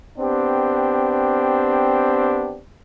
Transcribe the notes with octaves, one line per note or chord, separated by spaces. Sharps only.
B3 C4 D4 G4